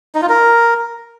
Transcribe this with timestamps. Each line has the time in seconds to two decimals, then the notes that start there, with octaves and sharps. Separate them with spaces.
0.15 D#4
0.22 F4
0.29 A#4